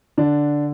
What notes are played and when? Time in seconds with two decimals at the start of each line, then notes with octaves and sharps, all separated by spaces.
0.18 D3 D4